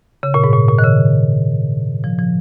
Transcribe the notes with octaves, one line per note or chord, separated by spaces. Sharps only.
C#3
A#2
G#2
A#2
A#2
D#3
C#3
F3
F3